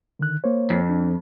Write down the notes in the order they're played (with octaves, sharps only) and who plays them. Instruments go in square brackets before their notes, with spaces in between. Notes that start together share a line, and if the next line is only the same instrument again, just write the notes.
[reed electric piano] D3 D#3 F#6
A#3 C5 C#5
[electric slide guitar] F2
[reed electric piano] D4